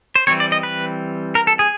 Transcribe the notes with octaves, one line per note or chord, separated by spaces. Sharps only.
C5
E3 G3 C4 C#5
D5
D#5
B4
A#4
A4
G#4